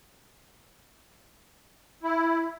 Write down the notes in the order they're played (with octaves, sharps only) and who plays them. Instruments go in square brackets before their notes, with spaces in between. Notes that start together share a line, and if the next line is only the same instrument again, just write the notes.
[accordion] E4